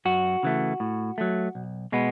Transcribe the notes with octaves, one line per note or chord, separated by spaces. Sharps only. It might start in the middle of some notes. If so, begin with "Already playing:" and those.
F#2 F#4
C#3 E3 A3
A2
F#3 A3
B1
B2 G#3 B3